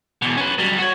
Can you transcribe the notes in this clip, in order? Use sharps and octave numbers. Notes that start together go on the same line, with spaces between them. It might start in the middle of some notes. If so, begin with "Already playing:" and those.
E2 B2
C#4 B4
F#3 G3
F#4 C#5